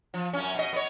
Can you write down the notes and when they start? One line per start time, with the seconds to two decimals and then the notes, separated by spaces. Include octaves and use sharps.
0.14 F3
0.33 F#2 C#4
0.55 B2 D#5
0.73 B3 C#5